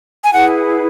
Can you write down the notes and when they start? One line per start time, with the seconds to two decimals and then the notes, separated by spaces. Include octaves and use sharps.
0.24 G#5
0.33 E4 G#4 B4 F#5